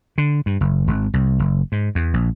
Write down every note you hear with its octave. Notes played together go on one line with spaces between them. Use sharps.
D3
G2
F#1
G#1
C2
F#1
G#2
E2
A#1